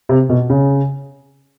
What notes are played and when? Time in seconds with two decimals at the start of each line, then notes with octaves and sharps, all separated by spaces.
0.09 C3
0.29 B2
0.50 C#3